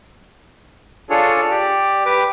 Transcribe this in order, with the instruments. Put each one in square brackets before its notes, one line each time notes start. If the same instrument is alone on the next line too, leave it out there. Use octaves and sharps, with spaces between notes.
[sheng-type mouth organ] D4 F4 G#4 A4 C#5
G4 D5
G4 B4 D6